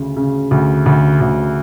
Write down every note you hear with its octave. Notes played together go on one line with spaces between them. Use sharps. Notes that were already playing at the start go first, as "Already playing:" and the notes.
Already playing: D2 C#3
C#3
D2
D2
D2